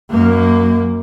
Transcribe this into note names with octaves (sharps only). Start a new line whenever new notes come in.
F#2 A#3